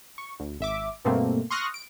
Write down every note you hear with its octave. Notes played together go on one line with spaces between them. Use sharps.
C#6
D2
G#1 E5 D6
G2 B2 A3 A#3 C4
C6 C#6 D#6 F6 F#6 A#6
D7